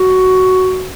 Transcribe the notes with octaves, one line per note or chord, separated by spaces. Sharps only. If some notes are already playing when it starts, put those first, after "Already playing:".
Already playing: F#4